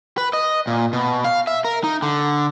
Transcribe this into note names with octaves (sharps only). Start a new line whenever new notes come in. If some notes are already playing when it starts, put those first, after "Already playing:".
B4
D#5
A#2
B2
F5
E5
A#4
D#4
D3